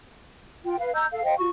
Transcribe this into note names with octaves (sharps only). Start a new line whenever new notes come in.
F4 G5
B4 F5
D#5 A#5 E6 G6
A4 F5
C5 D#5 F5 G5
F4 F#4 C#6